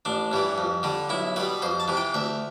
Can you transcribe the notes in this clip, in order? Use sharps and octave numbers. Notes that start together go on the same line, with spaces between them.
A1 D4
G2 E3 G3
F2
D3 G3
B1 E4
B2 G3 B4
F2 C5
A5
C3 E3
G5
D2 E5